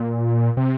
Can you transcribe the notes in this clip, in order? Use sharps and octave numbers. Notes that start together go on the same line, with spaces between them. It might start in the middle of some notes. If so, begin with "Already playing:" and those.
Already playing: A#2
C3